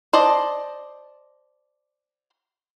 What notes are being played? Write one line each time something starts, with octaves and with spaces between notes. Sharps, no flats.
C5 D5 D#5 A5